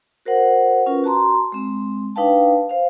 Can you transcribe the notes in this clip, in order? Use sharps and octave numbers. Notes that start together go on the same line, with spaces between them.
F#4 A#4 C5 F#5
C#4 F4 A#4 B4
F#4 A5 A#5 C6
G#3 C4
D4 D#4 B4 F5 G5 A5
C5 F5